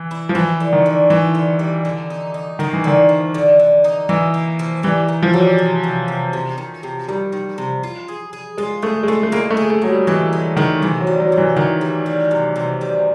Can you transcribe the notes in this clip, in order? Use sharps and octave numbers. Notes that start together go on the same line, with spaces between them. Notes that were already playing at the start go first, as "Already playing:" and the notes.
Already playing: E3
E4
F3
E3 E4
D3
D#3
D3
E3 E4
D3
G3
D3
D#4
D#4
D#3 A#3
E3
D3 D#3
F3
D3
D3
D#4
E3 A#3
A#3
F3
E3 G3
D#3
F3
F#3 G3
C3
C3
C3
C3
D#3
C3
D#3 G3
D#3
C3
F4
G#4
G#4
G#3 F4
A3 G#4
G#3
A3 F4
A3
G#3 A#3
A3
G#4
A3
F#3 G#4
G3
E3 G#3
G#3
D#3 G#3
C3 E3
F#3
G3
F#3
C3
E3
D#3 E3
G3
G3
C3
C3
G3